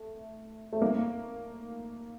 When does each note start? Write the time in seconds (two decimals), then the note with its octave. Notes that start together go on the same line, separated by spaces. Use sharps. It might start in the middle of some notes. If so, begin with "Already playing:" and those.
Already playing: A3
0.73 A3
0.82 A#3